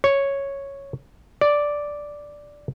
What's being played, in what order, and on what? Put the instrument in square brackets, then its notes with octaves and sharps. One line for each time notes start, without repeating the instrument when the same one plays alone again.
[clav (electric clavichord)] C#5
D5